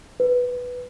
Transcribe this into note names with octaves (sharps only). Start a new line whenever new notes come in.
B4